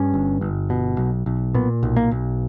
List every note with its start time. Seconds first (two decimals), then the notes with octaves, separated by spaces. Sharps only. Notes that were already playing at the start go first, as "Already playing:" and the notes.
Already playing: G2 C#4
0.14 G1
0.41 G1
0.70 B2
0.98 B1
1.26 B1
1.54 A#2 B3
1.83 B1
1.97 A#3
2.11 B1